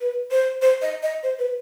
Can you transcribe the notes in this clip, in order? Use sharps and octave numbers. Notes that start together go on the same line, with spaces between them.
B4
C5
C5
D#5
D#5
C5
B4